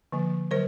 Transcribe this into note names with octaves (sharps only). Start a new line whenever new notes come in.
D3 F3 A#3
D3 F#3 A#4 C5